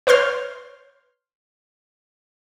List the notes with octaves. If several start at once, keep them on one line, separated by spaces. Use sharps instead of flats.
B4 C#5 C6 F6 G6